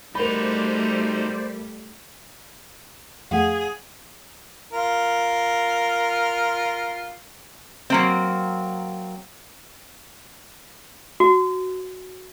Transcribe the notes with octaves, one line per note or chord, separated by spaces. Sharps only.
G3 A3 D#4 F#4 A#4 C5 D5 B5
F2 F3 A3 G#4 F5 F#5
F4 A#4
F#3 A#3 C4
F#4